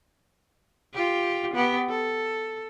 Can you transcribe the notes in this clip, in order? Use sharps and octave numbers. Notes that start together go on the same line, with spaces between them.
F4 G4
B3 G4
A4